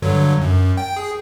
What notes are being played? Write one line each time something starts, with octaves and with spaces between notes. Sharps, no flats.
G2 D3 F#3
F#2
G5
G#4